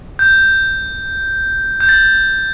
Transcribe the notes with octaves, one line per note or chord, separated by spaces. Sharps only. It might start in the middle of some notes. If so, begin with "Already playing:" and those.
G6
G6
A6